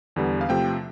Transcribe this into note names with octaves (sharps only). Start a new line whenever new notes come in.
E2 D3 G3 B3
F5
C3 F3 A3 C4 G5